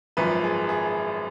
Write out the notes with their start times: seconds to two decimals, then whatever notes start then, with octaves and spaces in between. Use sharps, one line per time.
0.17 G#1 F#2 F3 B4
0.43 G#4
0.69 G#4